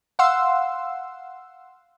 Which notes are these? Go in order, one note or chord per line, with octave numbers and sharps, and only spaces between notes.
F5 F#5 C6 E6